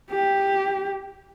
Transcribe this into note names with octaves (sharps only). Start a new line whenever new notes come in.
G4